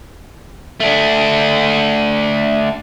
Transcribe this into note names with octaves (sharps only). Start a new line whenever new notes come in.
A3 D4